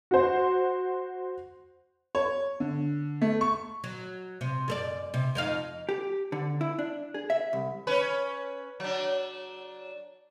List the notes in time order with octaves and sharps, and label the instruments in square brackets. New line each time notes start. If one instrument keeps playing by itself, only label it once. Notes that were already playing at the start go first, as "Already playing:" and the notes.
[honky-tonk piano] F#4 C5
C#5
D3
A3
C#6
[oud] F#3
C3
F#2 A4 D5
C3
F2 D#4 F5
[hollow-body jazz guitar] G4
D3
E4
D4
G#4
E5
C2
[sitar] C#4 B4
F#3 D4